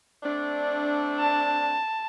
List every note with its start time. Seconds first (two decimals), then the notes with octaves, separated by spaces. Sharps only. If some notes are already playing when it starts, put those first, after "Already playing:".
0.23 A3 C4 D4
1.20 A5